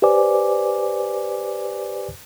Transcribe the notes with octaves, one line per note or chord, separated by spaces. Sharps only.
G4 B4 C5 D5 G#5 D6